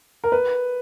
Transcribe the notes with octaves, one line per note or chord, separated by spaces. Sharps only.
A#4
B4